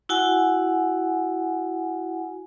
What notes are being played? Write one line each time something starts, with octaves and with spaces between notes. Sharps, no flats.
E4 F#4 F#5 G#5